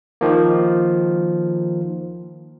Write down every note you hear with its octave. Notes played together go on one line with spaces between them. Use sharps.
D#3 F3 A#3